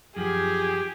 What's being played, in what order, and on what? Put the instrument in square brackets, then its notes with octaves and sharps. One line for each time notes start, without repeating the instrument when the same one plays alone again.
[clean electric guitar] F#2 F3 [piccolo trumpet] G4 [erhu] G#4